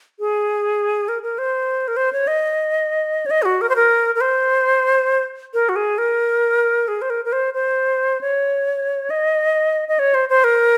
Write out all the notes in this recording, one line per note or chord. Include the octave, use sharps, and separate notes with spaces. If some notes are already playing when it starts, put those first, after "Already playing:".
G#4
A#4
A#4
C5
A#4
C5
C#5
D#5
C#5
D#5
G#4
F#4
A#4
C5
A#4
A#4
C5
A#4
F#4
G#4
A#4
G#4
C5
A#4
A#4
C5
C5
C#5
D#5
D#5
C#5
C5
C5
A#4